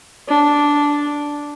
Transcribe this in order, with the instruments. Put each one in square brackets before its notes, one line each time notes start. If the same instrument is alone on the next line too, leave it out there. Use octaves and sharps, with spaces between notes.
[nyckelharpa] D4